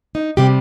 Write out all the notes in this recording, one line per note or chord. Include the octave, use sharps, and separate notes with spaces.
D#4
C3 G3 G4